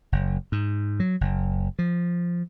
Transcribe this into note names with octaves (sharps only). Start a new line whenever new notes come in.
F#1
G#2
F#3
F#1
F3